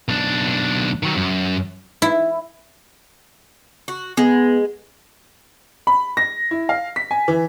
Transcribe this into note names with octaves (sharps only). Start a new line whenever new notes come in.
B1 D4
D#3 F#3
F#2
E4
F#4
G#3 B3
B5
A#6
E4
F5
B6
G#5
E3